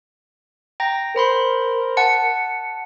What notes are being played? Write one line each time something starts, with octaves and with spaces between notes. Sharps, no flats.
G5 A#5 A#6
A#4 C5 B5 C6
F#5 A5 C#7